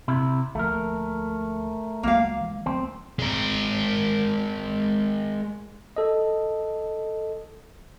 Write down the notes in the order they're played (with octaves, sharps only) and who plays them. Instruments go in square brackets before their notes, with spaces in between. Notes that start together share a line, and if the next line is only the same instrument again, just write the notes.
[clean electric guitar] C3 E4
[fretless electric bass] D2 F3 A#3 [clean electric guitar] A3 A#4
[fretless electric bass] C#2 F#3 G#3 [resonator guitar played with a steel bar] A#3 F5
[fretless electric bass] E3 G#3
[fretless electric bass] D2 F#3 B3 [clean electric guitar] C4
[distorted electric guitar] G#3 A#4
[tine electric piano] A4 D#5